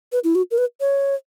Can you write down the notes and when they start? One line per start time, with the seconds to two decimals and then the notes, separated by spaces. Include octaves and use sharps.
0.12 B4
0.24 E4
0.35 F#4
0.51 A#4
0.58 B4
0.80 C#5